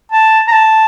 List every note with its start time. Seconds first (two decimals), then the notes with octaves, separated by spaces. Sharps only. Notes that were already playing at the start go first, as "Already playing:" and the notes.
0.12 A5
0.47 A#5
0.52 A5